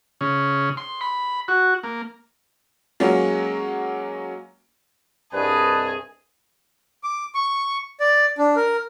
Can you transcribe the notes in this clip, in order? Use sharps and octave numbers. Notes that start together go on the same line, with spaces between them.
C#3
C6
B5
F#4
A#3
F#3 G#3 A#3 C#4
C2 G2 G#4 B4 D#5 A5
D6
C#6
D5
D4
A#4